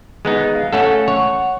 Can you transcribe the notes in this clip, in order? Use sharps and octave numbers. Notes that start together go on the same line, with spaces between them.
G#3 B3 D#4
F5
A3 C#4 A4 F#5
C#5